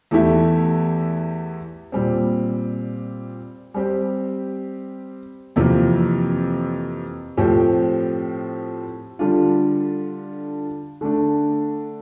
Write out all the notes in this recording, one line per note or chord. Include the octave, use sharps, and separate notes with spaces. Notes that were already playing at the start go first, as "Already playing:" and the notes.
E2 E3 A3 E4 G4
A#2 G3 C4
G3 C4 G4
F2 C3 E3 A#3 F4
A2 F3 C4 G4
D3 G3 D4 F4
D3 A3 D4